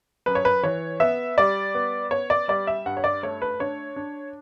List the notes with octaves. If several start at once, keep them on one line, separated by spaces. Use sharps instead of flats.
F#2 B4
C#5
B4
E3 C#5
B3 E5
G3 D5
B3
B3 C#5
D5
G3 D5
E5
G2 F#5
C#5
D5
A3 C#5
B4
D4 C#5
D4